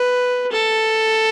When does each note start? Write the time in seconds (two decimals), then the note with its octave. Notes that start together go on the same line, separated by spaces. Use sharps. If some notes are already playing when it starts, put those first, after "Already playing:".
Already playing: B4
0.52 A4